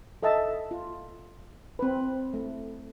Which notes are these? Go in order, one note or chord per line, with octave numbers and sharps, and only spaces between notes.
A4 D#5 E5 A5
F4
C4 B4
A3